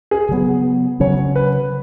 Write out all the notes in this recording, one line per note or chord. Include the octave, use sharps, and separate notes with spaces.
G#4
C#3 F#3 B3
C#3 F#3 C#4 C#5
B4